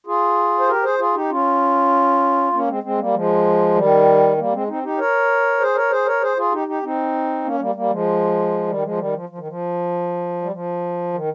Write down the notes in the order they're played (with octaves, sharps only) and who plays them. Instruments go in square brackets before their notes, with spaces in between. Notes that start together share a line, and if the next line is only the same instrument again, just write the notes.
[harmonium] F4 G#4
C5
G4 A#4
G#4 C5
F4 G#4
D#4 G4
C#4 F4
A#3 C#4
G#3 C4
G#3 C4
G3 A#3
F3 G#3
D#3 G3
G3 A#3
G#3 C4
C4 D#4
D#4 G4
A#4 C#5
G#4 C5
A#4 C#5
G#4 C5
A#4 C#5
G#4 C5
F4 G#4
D#4 G4
D#4 G4
C4 D#4
A#3 C#4
G3 A#3
G3 A#3
F3 G#3
D#3 G3
F3 G#3
D#3 G3
F3
F3
D#3
F3
G3
F3
D#3